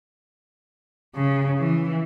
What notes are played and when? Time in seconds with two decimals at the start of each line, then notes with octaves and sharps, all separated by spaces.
1.15 C#3
1.59 E3